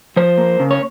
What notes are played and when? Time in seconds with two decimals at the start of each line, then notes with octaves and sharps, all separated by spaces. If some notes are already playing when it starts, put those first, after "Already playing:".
0.16 F3 C5
0.38 A#3
0.60 C#3
0.71 C#5